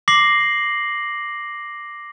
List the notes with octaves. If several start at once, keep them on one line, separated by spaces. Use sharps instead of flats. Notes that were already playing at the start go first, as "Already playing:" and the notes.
D6 A#6 C7 F#7